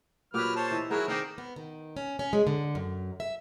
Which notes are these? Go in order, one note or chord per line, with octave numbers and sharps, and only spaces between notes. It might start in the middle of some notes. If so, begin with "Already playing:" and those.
A#2 F#3 G4 B4 F6
C5 C#5 A5
E3 D#5 E5
F#3 D#4 E4 F#4 G#4 A#4
D#3 C4 A#4 D5 D#5
B3
D#3
C#4
C#4
G#3
D3
F#2
E5